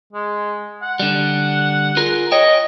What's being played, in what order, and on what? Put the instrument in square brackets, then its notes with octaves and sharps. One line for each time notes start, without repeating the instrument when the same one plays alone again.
[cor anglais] G#3
F#5
[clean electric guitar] D3 G3
F4 G#4 A#4
[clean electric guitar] C#5 G5 [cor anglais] D#5